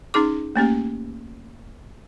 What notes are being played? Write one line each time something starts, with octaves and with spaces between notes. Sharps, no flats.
C#4 D#4 G#4 D6
A3 A#3 C#4 G4